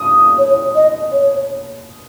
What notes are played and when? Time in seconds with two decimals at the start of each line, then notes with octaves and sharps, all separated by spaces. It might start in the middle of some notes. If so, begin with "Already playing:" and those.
Already playing: D#6
0.38 C#5
0.75 D#5
1.12 C#5